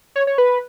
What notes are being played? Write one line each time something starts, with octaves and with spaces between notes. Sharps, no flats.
C#5
C#5
B4